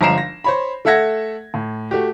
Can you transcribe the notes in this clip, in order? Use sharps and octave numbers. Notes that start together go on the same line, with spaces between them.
G1 F3 G#3 A#5 C7 E7
A#6
C5 C#5 B5
A3 A4 E5 F#5 G#6 A#6
A2
A3 F#4 G4